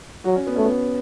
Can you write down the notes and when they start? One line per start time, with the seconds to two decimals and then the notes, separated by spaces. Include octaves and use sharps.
0.24 F#3 F#4
0.36 C#4
0.47 B3
0.56 A3 C#4
0.64 B3